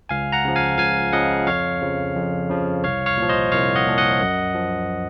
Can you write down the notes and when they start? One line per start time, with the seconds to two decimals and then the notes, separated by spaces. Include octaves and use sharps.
0.09 C#2 F5 G#5
0.32 F#5 A#5
0.45 C#3 F3
0.56 F5 G#5
0.78 C#2 F5 G#5
1.13 C#3 F3 D#5 F#5
1.47 F2 C#5 F5
1.81 C#3 F3
2.15 F2
2.50 C#3 F3
2.84 C2 C#5 F5
3.06 C#5 F5
3.17 A#2 F3
3.29 C5 D#5
3.52 C2 C#5 F5
3.75 D#5 F#5
3.87 A#2 F3
3.98 D#5 F#5
4.21 F#2
4.54 F3